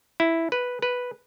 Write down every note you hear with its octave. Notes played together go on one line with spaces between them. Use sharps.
E4
B4
B4